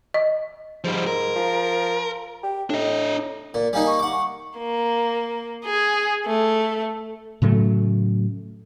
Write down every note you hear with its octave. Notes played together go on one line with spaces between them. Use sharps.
D#5
G#2 F3 G3
A#4
F3
G4
A2 D4 D#5
A#2 D5
G3 A#3 D#4 G#5
C#6
F#5 D6
C#6
A#3
G#4
A3
A2 C#3 F#3 A3